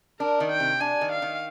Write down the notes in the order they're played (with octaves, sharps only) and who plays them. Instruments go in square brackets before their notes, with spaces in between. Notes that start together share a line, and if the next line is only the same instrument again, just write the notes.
[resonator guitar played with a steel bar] D4 [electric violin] A#4
[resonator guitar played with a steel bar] D#3
[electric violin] G5
[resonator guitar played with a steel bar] C3
[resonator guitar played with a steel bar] D4 [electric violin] G#5
[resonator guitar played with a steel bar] D#3
[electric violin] F5
[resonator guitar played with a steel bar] D#3